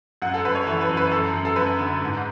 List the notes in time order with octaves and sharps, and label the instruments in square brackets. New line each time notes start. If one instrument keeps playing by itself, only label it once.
[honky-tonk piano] F#2 F#5
A4
F#2 B4
C#5
E3 A4
B4
F#2
B4
F#2 A4
F#2
A4
F#2 B4
D3
G#2